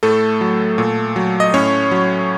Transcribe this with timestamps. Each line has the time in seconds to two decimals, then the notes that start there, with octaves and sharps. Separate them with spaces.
0.03 A2 A3 A4
0.41 F#3
0.78 A#2
1.16 F#3
1.40 D#5
1.54 A2 C#4 C#5
1.91 F#3